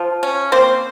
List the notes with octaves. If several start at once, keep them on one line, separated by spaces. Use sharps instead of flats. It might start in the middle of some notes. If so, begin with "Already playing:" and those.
Already playing: F3
C#4
A#3 C4 C5